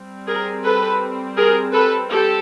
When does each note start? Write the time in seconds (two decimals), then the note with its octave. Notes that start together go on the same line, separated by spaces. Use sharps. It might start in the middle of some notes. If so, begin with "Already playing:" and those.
Already playing: G3 C4
0.27 G#4 A#4
0.63 A4 B4
1.37 G#4 A#4
1.73 A4 B4
2.10 G4 A4